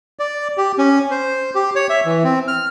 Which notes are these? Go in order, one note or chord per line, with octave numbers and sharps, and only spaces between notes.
D5
G4
C#4
C5
G4
C#5
E5
E3
C4
F6